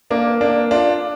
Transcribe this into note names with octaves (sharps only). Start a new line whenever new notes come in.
A#3 D4
A#3 D4
D4 F4